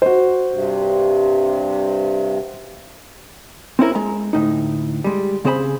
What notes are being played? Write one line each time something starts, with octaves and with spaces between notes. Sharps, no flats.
F#4 C5
G2 C3
C4 C#4 E4 A#4
G#3 A#5
D2 A2 D#4
G3 G#3
C#3 C4 G#4 C5 D5 B5